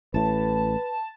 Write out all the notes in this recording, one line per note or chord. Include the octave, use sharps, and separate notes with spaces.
A1 A2 B4 A5